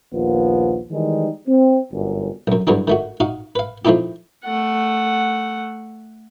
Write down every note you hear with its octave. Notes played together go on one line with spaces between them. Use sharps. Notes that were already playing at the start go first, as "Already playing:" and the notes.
A#1 D#2 F3 B3 F4
D#3 E3 G3 G#3 D#4
C4
G1 F#2
B1 F#2
E2 G2 D3 F#3 D4
D#3 A3 F#4
D#4 F#4 F5
B4 F5
F3 A3 C4 D#4 E4 G4
A3 F#5